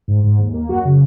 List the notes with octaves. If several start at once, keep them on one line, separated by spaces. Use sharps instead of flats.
G#2
G#2
D#2
A#3
F#2 F#4
C#3